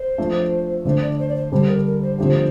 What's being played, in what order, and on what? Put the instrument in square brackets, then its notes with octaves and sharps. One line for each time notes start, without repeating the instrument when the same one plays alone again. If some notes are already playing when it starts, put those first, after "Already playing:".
Already playing: [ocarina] C5
[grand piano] F3 A3 D4
[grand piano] D3 A3 D4 [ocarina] C5
[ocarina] D5
C5
D5
C5
[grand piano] D3 G3 D4 A4 [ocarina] C5
[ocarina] A#4
A#4
C5
[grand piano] D3 F3 A3 D4 G4 [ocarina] C5